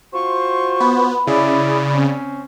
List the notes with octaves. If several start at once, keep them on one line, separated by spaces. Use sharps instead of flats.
F4 F#4 C5 C#6
B3 B5
C#3 E4 G#4 D5
C4 C#4